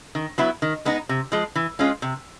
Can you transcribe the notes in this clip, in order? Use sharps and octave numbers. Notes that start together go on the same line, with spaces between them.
D#3
F#3 B3 E4
D#3
G#3 B3 D#4
C3
F3 G#3
E3
G#3 C#4 F4
C3